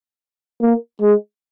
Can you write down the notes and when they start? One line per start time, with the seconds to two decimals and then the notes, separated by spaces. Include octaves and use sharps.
0.62 A#3
1.01 G#3